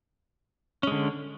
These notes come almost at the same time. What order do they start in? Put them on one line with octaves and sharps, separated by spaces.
C#4 G#3 D3